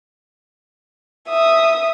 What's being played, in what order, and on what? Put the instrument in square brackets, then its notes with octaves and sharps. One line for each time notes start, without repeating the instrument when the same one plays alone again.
[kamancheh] E5 D#6